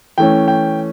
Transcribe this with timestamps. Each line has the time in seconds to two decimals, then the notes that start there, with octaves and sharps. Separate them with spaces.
0.18 E3 A3 C#4 G5
0.48 G5